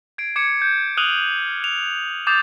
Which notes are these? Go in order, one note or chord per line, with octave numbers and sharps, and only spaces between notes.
G#6 C7 D7
D6 G#6 C#7
G6
D#6 F6 F#6 D#7 F7 F#7
F7
D6 D#6 G6 A6 C7 F7